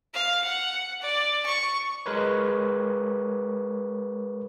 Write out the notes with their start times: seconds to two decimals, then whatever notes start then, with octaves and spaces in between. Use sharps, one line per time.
0.14 F5
0.44 F#5
1.01 D5
1.46 C#6
2.06 G#3 A#4 B4 C#5